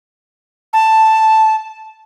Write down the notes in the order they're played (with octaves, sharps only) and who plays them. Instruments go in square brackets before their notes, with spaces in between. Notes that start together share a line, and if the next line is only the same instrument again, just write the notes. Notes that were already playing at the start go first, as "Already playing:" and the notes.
[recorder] A5